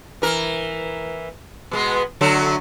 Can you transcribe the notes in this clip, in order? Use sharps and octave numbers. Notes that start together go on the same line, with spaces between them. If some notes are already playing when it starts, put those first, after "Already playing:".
E3 A#4
B2 G#3 B3
D3 F#3 A3